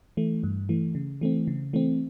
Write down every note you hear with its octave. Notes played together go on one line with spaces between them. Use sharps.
E3 A3
G2
E3 A3
C#3
E3 A3 C4
C#3
E3 A3 C4